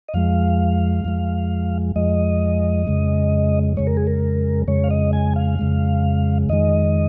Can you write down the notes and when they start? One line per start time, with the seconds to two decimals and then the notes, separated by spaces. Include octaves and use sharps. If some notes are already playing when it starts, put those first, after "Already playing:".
0.08 D#5
0.14 F2 F3 G#3 F5
1.05 F2 F3 G#3
1.96 F2 F3 G#3 D#5
2.87 F2 C#3 G#3
3.77 F2 C#3 G#3 C#5
3.87 A#4
3.97 G#4
4.07 A#4
4.68 F2 C#3 G#3 C#5
4.84 F5
4.91 D#5
5.13 G#5
5.36 F5
5.59 F2 C#3 G#3
6.49 F2 D#3 G#3 D#5